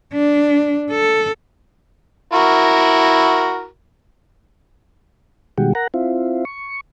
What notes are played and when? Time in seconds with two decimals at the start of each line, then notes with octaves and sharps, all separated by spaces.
0.13 D4
0.91 A4
2.32 E4 F#4 A#4
5.58 B2 D#3 G3 G#3 F#4 G4
5.75 A#4 F#5 A#5
5.94 C4 E4 F4
6.45 C#6